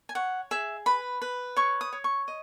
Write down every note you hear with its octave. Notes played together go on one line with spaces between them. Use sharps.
G#5
C#5 F#5
G#4 E5
B4 B5
B4
C#5 C#6
D#6
C#5
C#6
D#5